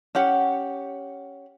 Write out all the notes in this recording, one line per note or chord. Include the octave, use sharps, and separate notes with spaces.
C#4 G4 F#5